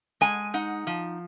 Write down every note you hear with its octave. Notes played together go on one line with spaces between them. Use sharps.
G#3 G#5
D#4 F#5
F3